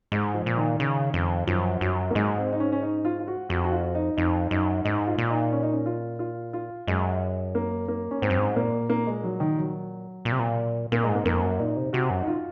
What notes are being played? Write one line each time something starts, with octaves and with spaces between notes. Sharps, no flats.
G#2 G#3
F3
A#2
D#3
C#3
F2
F#2 F3
F#2 F#3
A#3
G#2 G#3
C4
D#4
C#4
C#4
D#4
F4
F4
F#4
F2 F#4
F#4
F4
D#4
F2 D#4
F#2 D#4
G#2 D#4
F4
A#2
D#4
C#4
D#4
C#4
F4
F4
F4
F#2 G#3
A#3
A#3
C#4
G#2 C4
F#2
G#2
A#2 A#3
A#3
G#3
F#3
D#3
F#3
A#2
C3
A#2
A#2 A#3
G#3
G#2
A#3
F2 A#3
F#2
A#2 D#4
C3
C3 F#4
F#2
D#4
F4